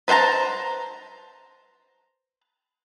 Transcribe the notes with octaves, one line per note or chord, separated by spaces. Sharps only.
B4 C5 F#5 A5 A#5